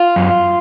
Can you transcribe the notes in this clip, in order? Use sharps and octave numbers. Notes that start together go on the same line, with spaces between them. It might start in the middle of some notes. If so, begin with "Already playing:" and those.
Already playing: F4
F#2